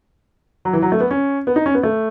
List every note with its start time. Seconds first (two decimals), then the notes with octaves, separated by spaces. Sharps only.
0.65 F#3
0.73 E3
0.82 F#3
0.92 A3
1.00 B3
1.11 C#4
1.47 B3
1.56 D#4
1.66 C#4
1.74 B3
1.83 A3